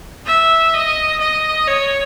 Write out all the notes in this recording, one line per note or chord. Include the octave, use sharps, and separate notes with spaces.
E5
D#5
D#5
C#5